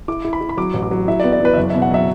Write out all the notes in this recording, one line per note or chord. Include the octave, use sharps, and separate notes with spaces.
E4 D6
E4
B5
E4
B5
F#3 D6
A1
D6
F#3
E4 E5
D5
B3
D5
E3 B4
E5
F#1 D5
E5
B2
F#5
F#3 E5